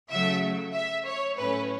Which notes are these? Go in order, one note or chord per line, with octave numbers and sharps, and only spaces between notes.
C#3 F#3 A3 E5
E5
C#5
A2 F#3 A3 C#4 B4